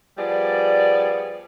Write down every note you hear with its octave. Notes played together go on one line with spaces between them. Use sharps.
F3 G3 B3 G#4 D5